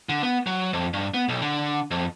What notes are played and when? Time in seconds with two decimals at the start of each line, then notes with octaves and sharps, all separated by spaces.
0.09 D3
0.22 B3
0.47 F#3
0.73 F2
0.94 G2
1.14 B3
1.29 B1
1.42 D3
1.91 F2